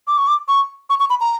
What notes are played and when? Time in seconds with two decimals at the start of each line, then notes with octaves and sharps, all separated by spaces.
0.07 D6
0.18 C#6
0.28 D6
0.48 C#6
0.90 C#6
1.00 C#6
1.10 B5
1.21 A#5